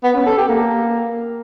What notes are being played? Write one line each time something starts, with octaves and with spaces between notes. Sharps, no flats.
B3
C#4
A4
G4
A#3